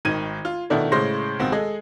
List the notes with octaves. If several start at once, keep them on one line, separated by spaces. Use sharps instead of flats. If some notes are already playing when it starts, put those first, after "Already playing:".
G#1 D#3 G#6 D#7
F4
B2 D#3 A3 B3 D4 E4
A2 C#3 G#3 C5 C6 A#6
C#2 B2 D#3 B3 C4
G#3 G#4 A4 D#5